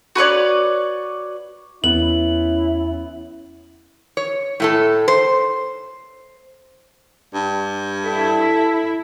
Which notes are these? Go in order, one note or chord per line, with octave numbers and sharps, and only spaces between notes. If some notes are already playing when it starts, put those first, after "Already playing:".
F#4 B4 C#5 D5
E2 B3 C#4 E4 F#7
C#5
A2 A3 A4
C5
G2
E4 A4